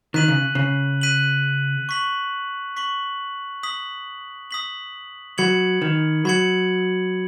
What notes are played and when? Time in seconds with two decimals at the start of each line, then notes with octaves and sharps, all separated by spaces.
0.14 D#3 F#6 B6 D#7 F#7
0.28 C#3
0.55 C#3
1.01 F#6 B6 D#7 F#7
1.89 C#6 B6 F#7
2.76 C#6 B6 F#7
3.63 D#6 B6 F#7
4.51 D#6 B6 F#7
5.38 F#3 B5 G#6 C#7 F#7
5.82 D#3
6.25 F#3 B5 G#6 C#7 F#7